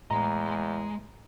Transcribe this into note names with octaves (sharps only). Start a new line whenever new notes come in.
E2 A2 G#3 D#5 A#5